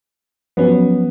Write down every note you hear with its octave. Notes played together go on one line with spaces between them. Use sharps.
F3 F#3 B3 C#4